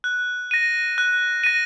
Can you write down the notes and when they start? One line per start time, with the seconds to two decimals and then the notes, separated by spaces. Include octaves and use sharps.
0.04 F#6
0.51 A#6 D#7
0.98 F#6
1.44 A#6 D#7